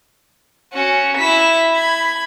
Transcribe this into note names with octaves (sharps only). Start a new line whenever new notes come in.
C#4 F#4
E4 B6
B5 G#6